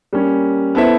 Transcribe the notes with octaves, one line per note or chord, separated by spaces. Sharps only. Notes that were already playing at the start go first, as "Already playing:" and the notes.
G3 A#3 C#4
B3 E4 A4 C5 E5